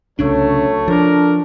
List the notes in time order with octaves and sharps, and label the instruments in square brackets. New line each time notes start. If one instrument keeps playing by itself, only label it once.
[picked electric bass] C2 C#3 D4 [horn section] F#3 A3 [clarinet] C#5
[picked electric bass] F3 [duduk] D4 [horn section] A4 A#4